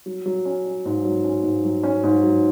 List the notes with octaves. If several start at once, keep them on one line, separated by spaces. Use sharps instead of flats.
F#3
F#3
C#4
C#4
G#2
F#3
C#4
G#2
F#3
C#4
G#2
F#3